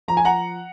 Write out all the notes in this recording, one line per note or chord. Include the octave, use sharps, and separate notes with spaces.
F3 A#5
G#5
F#5 A#5